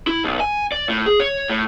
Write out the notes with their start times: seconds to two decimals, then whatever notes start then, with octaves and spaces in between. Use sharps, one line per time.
0.07 E4
0.24 B1
0.40 G#5
0.72 D5
0.89 A2
1.06 G#4
1.20 C#5
1.49 A2